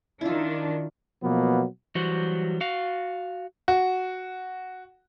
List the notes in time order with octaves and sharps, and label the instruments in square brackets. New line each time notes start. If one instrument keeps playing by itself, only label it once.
[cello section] D#3 D4 [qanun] E4 F4
[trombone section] B2 F3 F#3 A#3 B3
[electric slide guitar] E3 F#3 G3 F#4 C5
F#4 F5
[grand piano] F#4